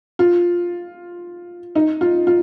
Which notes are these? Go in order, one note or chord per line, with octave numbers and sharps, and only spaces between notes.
F4
D#4
F4
F4